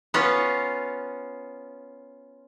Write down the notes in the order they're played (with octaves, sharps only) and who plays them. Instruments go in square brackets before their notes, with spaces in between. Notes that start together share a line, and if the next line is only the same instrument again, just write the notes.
[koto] B3 C#4 F4